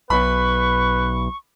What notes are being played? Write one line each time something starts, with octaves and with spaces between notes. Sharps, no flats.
B1 B4 B5 C#6